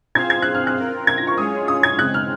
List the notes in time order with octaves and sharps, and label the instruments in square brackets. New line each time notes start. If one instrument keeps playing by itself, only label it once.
[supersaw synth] C4 F4 G#4 C5 F5 [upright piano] G#6
[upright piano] G#6
F#6
F6
F#6
[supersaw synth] C4 F4 A#4
[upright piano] G#6
A#6
C#6
[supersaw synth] G#3 C#4 F4 G#4 C#5 [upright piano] D#6
[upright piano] D#6
G#6
[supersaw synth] C#3 G#3 C4 [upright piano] F#6
[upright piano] F6